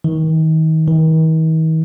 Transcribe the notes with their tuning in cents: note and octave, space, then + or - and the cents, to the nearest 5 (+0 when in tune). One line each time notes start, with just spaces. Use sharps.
D#3 +35
D#3 +45